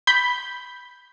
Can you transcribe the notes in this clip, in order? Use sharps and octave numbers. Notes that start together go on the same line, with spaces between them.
B5 G6